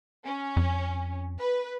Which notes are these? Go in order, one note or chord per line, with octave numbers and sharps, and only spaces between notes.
C#4
F2
B4